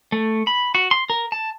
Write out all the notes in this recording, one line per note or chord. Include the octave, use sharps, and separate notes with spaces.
A3
B5
F#4
C6
A#4
A5